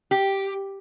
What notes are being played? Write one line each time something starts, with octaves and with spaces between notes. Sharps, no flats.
G4